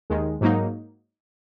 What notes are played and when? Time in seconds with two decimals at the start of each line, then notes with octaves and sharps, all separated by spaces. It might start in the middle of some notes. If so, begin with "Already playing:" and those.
0.10 D#2 D#3 G#3
0.41 G#2 F#3 A#3 D#4